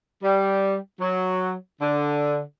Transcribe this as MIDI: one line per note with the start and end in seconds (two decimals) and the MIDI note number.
0.23 0.76 55
1.00 1.54 54
1.82 2.41 50